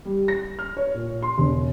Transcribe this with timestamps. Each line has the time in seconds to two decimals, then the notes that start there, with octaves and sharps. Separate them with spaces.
0.05 G3
0.28 A#6
0.59 F6
0.77 C#5
0.94 A#2
1.22 C6
1.38 E1